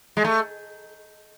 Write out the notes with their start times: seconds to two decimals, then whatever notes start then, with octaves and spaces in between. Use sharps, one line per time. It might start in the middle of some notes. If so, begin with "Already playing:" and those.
0.17 G#3
0.24 A3